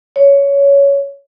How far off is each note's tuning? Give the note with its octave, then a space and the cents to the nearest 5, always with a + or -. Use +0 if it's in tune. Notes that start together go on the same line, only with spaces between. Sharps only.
C#5 +15